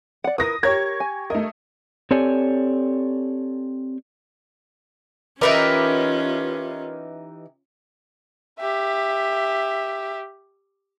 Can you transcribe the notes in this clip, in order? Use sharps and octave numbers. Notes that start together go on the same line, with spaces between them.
D5 F#5
E4 A#4 B4 D#6 A#6
G4 A#4 C#5 C#6 G#6
G#5
A3 A#4 D#5
C4 G4 A4 C#5 D5 G#5
E3 C#4 D#4 F4 G4 A#4 B4 D5
G4 E5